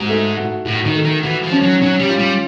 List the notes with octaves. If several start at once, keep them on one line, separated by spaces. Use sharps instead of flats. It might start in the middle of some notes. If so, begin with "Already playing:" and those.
Already playing: G#2 F#4
A3
F#4
A2 F#4
D#3
A3
D#3
E3 F#4
F3
C#4
F#3
F#3 C#4
G3
F4
G3